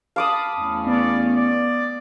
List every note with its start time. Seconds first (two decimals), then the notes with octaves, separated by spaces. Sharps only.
0.16 F5 A5 B5 D6 D#6
0.56 E2 A3 C#4
0.87 B3 D5
1.37 D5